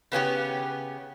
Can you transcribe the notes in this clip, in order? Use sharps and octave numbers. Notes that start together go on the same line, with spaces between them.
C#3 B3 C#4 G4